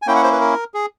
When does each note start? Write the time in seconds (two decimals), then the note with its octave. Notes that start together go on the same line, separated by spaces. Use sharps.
0.02 G#5
0.07 A#3 C#4 E4 G5
0.16 F#5
0.23 C5
0.32 B4
0.41 A#4
0.74 G#4